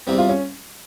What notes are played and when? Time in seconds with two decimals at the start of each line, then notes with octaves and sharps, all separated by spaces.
0.07 E2 C3 G3 C4
0.18 F4
0.29 C#4